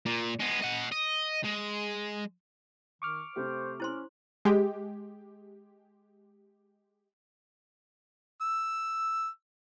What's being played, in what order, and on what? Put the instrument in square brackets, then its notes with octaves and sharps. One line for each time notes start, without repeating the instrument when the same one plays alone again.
[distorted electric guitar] A#2
G#3 B3
D#5 F#5
D#5
G#3
[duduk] D#3 [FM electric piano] C#6 D6 F6
[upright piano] C3 A3 G4 [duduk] C5
[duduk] C#4 [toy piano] E4 C5 C6
[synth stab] G#3 G4
[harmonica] E6